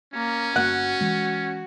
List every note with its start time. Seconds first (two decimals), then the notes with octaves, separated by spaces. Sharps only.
0.14 A#3 C#4
0.56 G1 A#3 F#4 F#5
1.01 E3 G#3